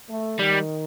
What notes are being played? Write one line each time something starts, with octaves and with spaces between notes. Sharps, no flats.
A3
D#3 G3